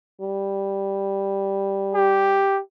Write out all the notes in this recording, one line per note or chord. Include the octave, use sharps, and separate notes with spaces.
G3
G4